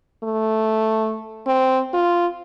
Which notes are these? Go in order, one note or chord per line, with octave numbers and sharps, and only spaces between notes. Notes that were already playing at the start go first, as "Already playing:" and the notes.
A3
C4
F4